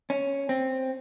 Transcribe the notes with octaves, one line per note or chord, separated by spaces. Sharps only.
C#4
C4